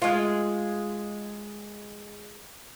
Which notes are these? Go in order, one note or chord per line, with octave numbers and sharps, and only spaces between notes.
G#3 F4